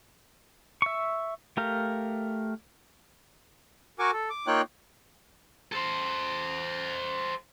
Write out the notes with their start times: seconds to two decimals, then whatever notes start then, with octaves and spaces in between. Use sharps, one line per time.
0.82 E5 C#6
1.57 A3 G4 A#4 F5
3.99 F#4 A#4 G#5 C#6 D6
4.13 A4
4.30 D6
4.47 A#3 D#4 F4 C#5 G5 F#6
5.72 A4 C5